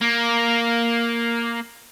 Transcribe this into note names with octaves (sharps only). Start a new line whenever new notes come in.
A#3